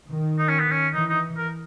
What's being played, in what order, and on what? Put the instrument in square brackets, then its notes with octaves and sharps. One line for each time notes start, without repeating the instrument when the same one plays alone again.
[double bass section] D#3
[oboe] D#4
C#4
B3
C#4
[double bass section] E3 [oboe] D#4
[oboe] D#4
A#4